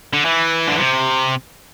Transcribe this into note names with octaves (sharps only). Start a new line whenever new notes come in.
D3
E3
D3
C3